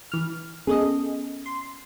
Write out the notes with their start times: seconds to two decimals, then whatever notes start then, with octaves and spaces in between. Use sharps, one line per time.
0.12 E3 F6
0.67 B3 C#4 G#4 A4 D#5
1.46 C6